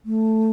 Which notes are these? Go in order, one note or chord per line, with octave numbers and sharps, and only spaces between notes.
A3